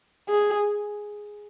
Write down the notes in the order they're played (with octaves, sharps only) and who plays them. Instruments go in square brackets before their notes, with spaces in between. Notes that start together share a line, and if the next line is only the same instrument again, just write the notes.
[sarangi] G#4